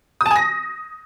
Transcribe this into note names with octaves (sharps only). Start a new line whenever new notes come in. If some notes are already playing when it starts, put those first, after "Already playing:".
D#6
A5
G#5
A#6